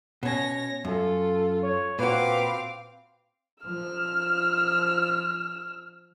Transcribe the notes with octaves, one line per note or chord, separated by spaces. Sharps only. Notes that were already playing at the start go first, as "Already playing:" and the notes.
B2 C#4 C#5 A#6
F#2 F4 A4
C#5
A#2 C4 F#4 B4 F5 D6
F3 E6 F6